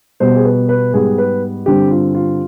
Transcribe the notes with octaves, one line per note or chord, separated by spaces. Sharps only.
B2 G3 B3 C5
G#4
B4
B4
G#2 G3 B3 G#4
B4
G2 D3 G3 C4 G4
F4
F4